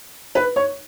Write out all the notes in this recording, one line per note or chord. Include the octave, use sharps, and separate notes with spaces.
B4
C#5